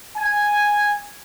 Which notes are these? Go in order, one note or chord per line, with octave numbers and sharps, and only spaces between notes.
G#5